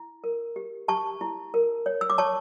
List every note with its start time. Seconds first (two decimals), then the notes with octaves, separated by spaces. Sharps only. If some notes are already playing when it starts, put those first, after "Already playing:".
Already playing: E4
0.24 A#4
0.56 G4
0.88 G4 A5 C#6
1.21 E4
1.54 A#4
1.86 C#5
2.01 E6
2.10 D6
2.18 C#5 A5 C#6